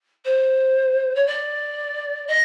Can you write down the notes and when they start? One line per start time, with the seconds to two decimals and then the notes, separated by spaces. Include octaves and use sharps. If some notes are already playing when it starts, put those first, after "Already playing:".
0.25 C5
1.15 C#5
1.26 D5
2.27 D#5